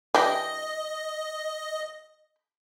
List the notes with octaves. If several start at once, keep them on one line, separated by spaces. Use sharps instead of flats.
E3 D4 G4 D#5